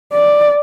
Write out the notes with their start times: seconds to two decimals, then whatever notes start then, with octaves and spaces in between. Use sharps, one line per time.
0.13 D5